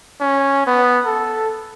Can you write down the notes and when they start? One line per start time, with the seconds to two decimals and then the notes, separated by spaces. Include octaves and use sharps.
0.21 C#4
0.66 B3
1.06 A4